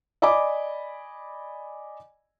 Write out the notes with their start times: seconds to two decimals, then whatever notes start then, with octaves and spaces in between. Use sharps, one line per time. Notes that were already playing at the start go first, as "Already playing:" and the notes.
0.22 D5 D#5 G#5 B5 D6